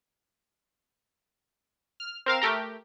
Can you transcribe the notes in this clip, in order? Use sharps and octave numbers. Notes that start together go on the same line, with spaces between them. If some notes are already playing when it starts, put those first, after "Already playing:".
F6
C4 A#4 F5 E7
A3 G4 A#4